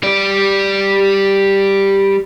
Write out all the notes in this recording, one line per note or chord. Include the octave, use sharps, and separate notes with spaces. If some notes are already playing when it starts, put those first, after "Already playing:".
G3 D5